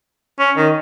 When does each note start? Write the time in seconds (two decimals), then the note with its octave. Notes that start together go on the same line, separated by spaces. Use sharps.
0.39 C#4
0.57 D#3